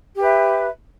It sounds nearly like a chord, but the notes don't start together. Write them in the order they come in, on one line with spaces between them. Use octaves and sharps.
G4 B4 E5